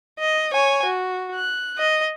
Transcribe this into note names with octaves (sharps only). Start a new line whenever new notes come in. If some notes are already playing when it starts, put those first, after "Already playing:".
D#5
C#5 G#5
F#4
F#6
D#5